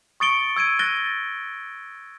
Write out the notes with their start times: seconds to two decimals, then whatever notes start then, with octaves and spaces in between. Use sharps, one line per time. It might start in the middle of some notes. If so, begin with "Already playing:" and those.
0.20 C#6 D#6 A6 C#7 D7 G7
0.56 E6 G#6 D7 D#7
0.79 F#6 A6 A#6 D#7 G7